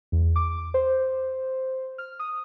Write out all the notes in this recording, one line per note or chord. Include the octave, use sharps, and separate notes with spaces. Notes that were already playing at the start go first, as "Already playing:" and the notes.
E2
D6
C5
F6
D#6